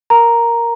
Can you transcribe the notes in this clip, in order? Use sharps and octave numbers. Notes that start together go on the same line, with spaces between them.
A#4 A#5